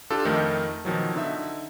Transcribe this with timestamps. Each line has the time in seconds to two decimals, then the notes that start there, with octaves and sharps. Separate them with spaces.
0.10 D4 F4 G4 A4
0.25 F2 D#3 A3 D#4 A#4
0.85 B2 D#3 F3 F#3
1.14 D3 D#4 E5